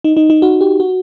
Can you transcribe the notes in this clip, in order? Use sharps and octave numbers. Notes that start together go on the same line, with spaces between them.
D#4
D#4
D#4
F#4
G4
F#4